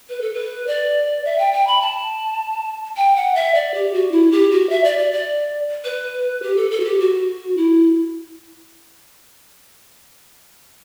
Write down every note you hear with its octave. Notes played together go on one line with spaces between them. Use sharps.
B4
A4
B4
D5
E5
G5
G5
B5
A5
G5
F#5
E5
D5
G4
F#4
E4
G4
F#4
E5
D5
D5
D5
B4
G4
A4
A4
F#4
G4
F#4
E4